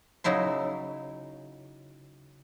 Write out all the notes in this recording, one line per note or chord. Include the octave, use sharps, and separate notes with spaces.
C#3 F#3 D#4 E4 C6